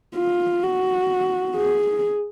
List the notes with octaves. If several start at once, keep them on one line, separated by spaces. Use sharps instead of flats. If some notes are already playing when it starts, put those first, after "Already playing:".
F4
F#4
G#4